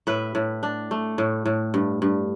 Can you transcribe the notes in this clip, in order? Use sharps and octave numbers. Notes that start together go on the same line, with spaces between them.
A2 B4 E5
A2
D4
A3
A2
A2
G2
G2